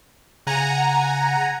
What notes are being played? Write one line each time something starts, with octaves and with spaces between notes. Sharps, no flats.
C#3 F#5 G#5 A#5